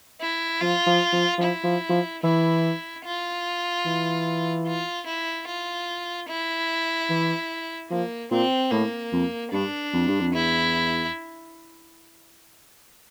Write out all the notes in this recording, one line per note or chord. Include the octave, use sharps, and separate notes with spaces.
E4
F3 F4
F3
F3
F3
E4
F3
F3
E3 E4
F4
E3
F4
E4
F4
E4
E3
F3 A#3
A#2 C4
A2 A#3
F2
G2 D4
F2
G2
F2
E2 E4